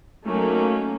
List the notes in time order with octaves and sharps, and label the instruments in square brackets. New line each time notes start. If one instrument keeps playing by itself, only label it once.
[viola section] F#3 A3 A#3 C#4 D#4